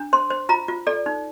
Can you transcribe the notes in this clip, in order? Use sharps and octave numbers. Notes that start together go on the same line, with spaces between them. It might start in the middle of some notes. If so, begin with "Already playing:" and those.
Already playing: D4
C5 C6
C5
F4 A#5
F4
A4 D5
D#4